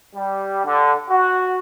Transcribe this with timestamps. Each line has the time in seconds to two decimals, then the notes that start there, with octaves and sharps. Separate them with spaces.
0.15 G3
0.65 D3
1.10 F#4